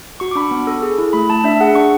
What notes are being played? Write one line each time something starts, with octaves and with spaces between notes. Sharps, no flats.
F#4 C#6
D6
D4 B5
C#6
B3
A4
G#4
E4
A3 B5
A3 A5
D4 E5
G#4 F#5
D4 C#6